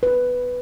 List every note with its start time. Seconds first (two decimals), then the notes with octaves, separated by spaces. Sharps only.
0.03 B4